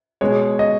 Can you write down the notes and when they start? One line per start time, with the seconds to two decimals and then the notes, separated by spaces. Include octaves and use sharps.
0.21 B2 G#3 C#5
0.59 D#5